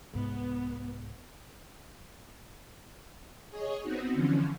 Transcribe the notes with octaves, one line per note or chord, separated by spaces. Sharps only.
C2 G#2 B3
G#4 C#5 D#5
B3 C4 D#4 F#4
D3 E3 F3 C#4